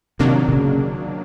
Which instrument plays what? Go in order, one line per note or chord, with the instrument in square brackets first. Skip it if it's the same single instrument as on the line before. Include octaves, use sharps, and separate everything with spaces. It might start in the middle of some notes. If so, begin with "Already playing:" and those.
[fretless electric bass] C3 [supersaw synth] D#3 F#3 A#3 D4
[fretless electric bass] C3
C#3